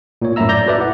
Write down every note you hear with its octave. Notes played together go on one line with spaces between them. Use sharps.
A#2 A#3 C#5
F#2 A2 E4 E5 A#5 E6
D5 A#5 G6 A#6
F#4 A4 B4 D5 E5
E4 F#5